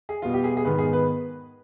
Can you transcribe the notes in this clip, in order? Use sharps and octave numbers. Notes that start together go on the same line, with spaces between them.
G#4
B2 G3 B3 F4
G4
G#4
G#4
G#2 D#3 B3 B4
G#4
B4